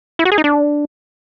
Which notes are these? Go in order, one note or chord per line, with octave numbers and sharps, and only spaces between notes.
E4
F#4
G#4
D#4
D4